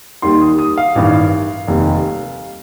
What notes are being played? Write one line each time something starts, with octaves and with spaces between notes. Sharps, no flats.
D#2 D#3 G3 C6
D#6
D#6
F5
A1 G2 D#3
F1 D#2 D#3 G3